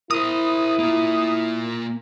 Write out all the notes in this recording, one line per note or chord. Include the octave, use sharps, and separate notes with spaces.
E4 A#4 C5 D#6
A#3 F4